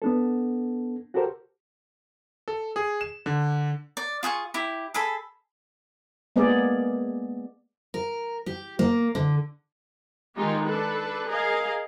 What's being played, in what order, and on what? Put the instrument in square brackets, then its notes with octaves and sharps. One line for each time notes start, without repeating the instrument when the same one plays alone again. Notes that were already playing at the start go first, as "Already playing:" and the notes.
[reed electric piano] B3 D4 A4
F#4 G4 A4 A#4 C5
[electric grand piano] A4
G#4
E7
D3
[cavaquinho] D5
F4 G#4 G5 C#6
E4 G4
G#4 A4 B5
[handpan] G#3 A#3 B3 G#4 D5
[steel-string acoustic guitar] A#4
G4
A#3
D3
[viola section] D#3 G#3 D#4 F4 G4
D4 A4 B4
G#4 A#4 D#5 F5